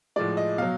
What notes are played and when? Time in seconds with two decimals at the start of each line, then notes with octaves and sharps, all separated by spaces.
0.16 A2 F3 G#3 D5
0.37 D#5
0.58 B2 F#3 F5